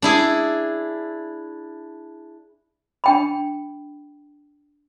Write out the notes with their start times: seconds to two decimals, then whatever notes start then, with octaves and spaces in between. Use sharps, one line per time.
0.02 D4 E4 G#4
3.04 D4 G5 B5